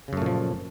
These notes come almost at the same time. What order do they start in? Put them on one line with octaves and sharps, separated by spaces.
C#3 F#2 A3 A#2 F3